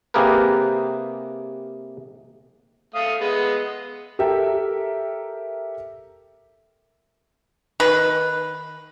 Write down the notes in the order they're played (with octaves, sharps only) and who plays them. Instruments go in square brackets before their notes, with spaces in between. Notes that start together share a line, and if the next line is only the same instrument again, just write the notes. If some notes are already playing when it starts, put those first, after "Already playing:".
[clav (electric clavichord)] C3 A#3 G4 G#4 A#4 B4
[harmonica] A3 F5 D#6
G#3 B3
[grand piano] G4 A4 A#4 E5 G5
[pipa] D#3 B4